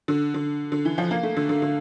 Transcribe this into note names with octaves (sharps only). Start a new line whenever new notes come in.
D3
D3
D3
E3
F3
A#3
A3
D3
D3
D3